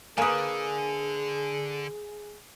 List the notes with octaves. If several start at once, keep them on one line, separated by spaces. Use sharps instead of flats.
D3 A#3 G#4 B4 G#5 D#6